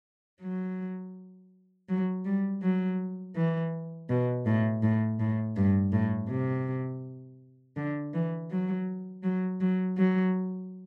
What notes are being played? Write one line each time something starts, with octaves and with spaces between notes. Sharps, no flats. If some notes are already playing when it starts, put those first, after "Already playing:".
F#3
F#3
G3
F#3
E3
B2
A2
A2
A2
G2
A2
C3
D3
E3
F#3
F#3
F#3
F#3